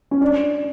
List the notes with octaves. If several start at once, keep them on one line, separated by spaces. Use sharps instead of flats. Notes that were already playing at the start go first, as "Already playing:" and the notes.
C#4
D4